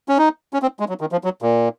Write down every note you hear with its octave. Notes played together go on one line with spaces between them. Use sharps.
C#4
D#4
C#4
C4
G#3
F#3
D#3
F3
F#3
A#2